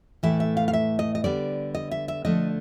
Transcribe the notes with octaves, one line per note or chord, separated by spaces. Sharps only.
A2 E3 A3 E5
E5
F5
F5
E5
D#5
D#5
D3 G3 B3 D5
D#5
E5
E5
D3 F3 A3 D#5